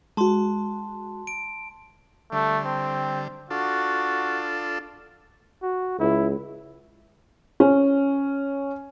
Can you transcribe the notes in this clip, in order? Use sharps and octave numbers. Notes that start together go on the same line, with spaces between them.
G#3 F#4 A5 C6
D7
D3 G3 A3
C4
D4 F4 F#4 A4
F#4
C#2 E4
C#4